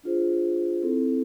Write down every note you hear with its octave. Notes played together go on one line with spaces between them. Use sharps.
D4 F4 G#4 C5
C4 E4 A4